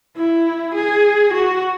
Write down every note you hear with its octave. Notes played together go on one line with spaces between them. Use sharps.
E4
G#4
F#4